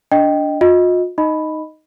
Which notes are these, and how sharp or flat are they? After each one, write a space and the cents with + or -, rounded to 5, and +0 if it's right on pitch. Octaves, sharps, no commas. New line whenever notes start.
D4 -10 D#5 -5 G5 +0
F4 +45 D#5 +15
D#4 +0 D#5 +0 B5 +0